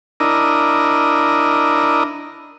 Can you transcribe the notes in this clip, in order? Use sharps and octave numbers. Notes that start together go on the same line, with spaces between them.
D4 E4 A#4 D#5